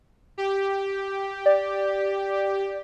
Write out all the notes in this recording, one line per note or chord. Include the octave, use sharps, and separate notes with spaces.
G4
D5